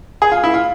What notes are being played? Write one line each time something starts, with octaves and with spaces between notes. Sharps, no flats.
G#4
F4
E4
F4